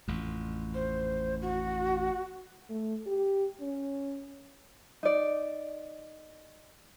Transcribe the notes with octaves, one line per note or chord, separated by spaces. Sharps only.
A1 F2
C5
F#4
A3
G4
C#4
D#4 D5